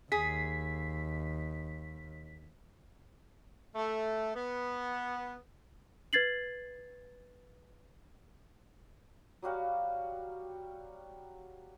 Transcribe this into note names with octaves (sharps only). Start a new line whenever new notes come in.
D#2 G#4 B6
A3
B3
B4 G#6 A6 C7 F#7
F#3 G3 F#4 F5